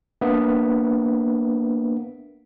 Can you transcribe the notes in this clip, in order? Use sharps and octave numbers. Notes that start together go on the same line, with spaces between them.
A#3 B3 D4 E5